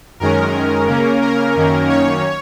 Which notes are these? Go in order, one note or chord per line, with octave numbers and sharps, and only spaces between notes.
F#2 D#3 G#3 C#4 A#4
C#3 A#3 C#4
A#4
F#2 D#3 A#3 C#4
C#5